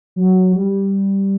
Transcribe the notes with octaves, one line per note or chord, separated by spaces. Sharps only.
F#3
G3